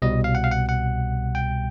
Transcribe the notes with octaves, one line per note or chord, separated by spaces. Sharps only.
C2 B2 G3 D#5
F5
F#5
F5
F#5
F#5
G5